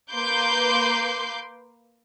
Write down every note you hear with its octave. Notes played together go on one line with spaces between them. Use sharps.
A#3 B4 C6 D6 G6